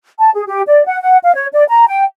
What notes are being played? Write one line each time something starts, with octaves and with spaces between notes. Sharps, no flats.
A5
G#4
G4
D5
F#5
F#5
F5
C#5
D5
A#5
G5